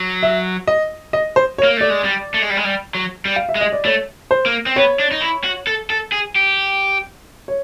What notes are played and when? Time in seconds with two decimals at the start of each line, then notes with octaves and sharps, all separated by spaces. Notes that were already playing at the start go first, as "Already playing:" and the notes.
Already playing: F#3
0.23 E5
0.67 D#5
1.13 D#5
1.36 C5
1.58 C#5
1.63 A#3
1.77 A3 D5
1.90 G#3
2.04 G3
2.34 A3
2.42 G#3
2.50 G3
2.57 G#3
2.64 G3
2.95 F#3
3.25 G3
3.36 F5
3.49 E5
3.55 G#3
3.61 D#5
3.73 D5
3.85 A3 C#5
4.31 C5
4.46 A#3
4.66 C4
4.76 B3 C#5
4.99 D4
5.12 D#4
5.22 E4
5.44 F#4
5.67 A4
5.90 A4
6.12 G#4
6.36 G4
7.48 C#5